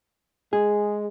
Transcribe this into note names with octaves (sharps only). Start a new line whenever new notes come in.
G#3 G#4